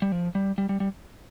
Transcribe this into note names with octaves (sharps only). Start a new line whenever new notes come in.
G3
F3
G3
G3
G3
G3